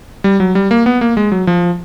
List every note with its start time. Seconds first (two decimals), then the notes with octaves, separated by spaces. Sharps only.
0.24 G3
0.40 F#3
0.55 G3
0.71 A#3
0.86 B3
1.01 A#3
1.17 G#3
1.32 F#3
1.47 F3